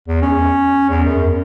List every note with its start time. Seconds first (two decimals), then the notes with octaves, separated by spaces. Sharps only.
0.08 E2
0.22 C#4
0.89 E2
1.05 F#2